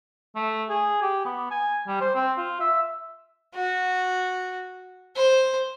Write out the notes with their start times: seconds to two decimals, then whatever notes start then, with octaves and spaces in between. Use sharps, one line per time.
0.35 A3
0.69 G#4
1.02 G4
1.25 B3
1.51 G#5
1.87 G3
2.01 C5
2.15 C4
2.37 F4
2.60 E5
3.55 F#4
5.16 C5